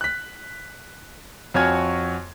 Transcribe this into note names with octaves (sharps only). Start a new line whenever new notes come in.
F#6 B6
F2 F#4 C#5 G#5 F6 G#6